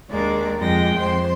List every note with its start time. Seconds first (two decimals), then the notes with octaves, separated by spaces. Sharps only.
0.10 D#2 G#3 A#3 D4 D5
0.59 F2 G#3 F4 G5 A#6
0.96 F2 C5 C6